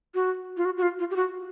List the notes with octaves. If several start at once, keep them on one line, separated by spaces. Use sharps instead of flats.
F#4
F4
F#4
F#4
F4
F4
G4
F#4